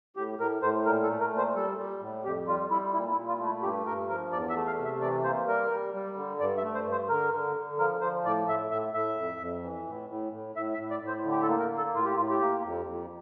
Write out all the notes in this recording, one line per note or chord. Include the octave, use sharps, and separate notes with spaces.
A2 G4
A2 A#4
A2 C5
A#2 A#4
A4
A3
A#4
A#2
C5
G3 A4
G3
A2
F2 G4
G3 F4
G3 E4
A#2 E4
E4
A#2
F4
A3
E4
G2 G4
G2 A#4
F3 A#4
E2 D5
E5
A3
F5
C3
E5
E3 D5
A#3 C5
G3 A#4
G3
G3
D3
G2 D5
E5
A3
C5
G2
C5
D3 A#4
D3
D3
F3 A#4
F3 C5
A2 D5
A2 E5
A2 E5
A2 E5
F2
F2
E3
A2
A2
A2
A2 E5
E5
A2
D5
A2
C5
D3
G4
A4
A#3
A#4
A#3
A4
A2 F4
G4
A2 F4
G4
A#3
F2
F2